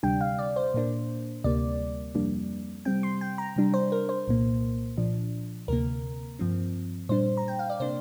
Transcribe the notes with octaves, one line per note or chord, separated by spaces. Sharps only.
D2 C3 G3 D4 G5
F5
D5
C5
A#2 A#3 D4
D2 C3 G3 A#3 D5
F2 C3 G3 A#3 D4
C3 G3 C4 G5
C6
G5
A#5
C3 G3 D4
C5
A#4
C5
C2 A#2 A#3
A#2 F3 D4
D2 C3 A#3 A#4
G2 F3 C4
A#2 G3 D4 C5
A#5
G5
F5
D5
C3 A#3 D4 C5